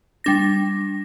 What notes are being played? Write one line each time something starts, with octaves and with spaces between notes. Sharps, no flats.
G3 D4 A#6